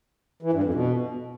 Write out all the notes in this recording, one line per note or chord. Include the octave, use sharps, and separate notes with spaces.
E3
G2
F2
B2